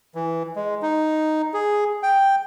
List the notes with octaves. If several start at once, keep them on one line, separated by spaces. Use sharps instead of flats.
E3
G#3
D#4
G#4
G5